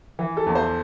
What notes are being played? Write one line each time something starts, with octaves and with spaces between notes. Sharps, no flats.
E3
A4
E2
C5